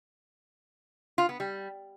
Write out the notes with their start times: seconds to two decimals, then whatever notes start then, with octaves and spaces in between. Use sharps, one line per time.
1.18 F4
1.29 B3
1.40 G3